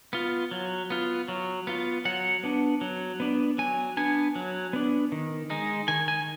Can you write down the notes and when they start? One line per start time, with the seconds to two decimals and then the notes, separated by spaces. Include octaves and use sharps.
0.13 B3 F4
0.51 F#3
0.90 B3 F4
1.28 F#3
1.67 B3 F4
2.05 F#3 F#5
2.43 B3 D4
2.81 F#3
3.20 B3 D4
3.58 F#3 G#5
3.97 B3 D4 G#5
4.35 F#3
4.73 B3 D4
5.12 D#3
5.50 G#3 D#4
5.88 D#3 G#5
6.08 G#5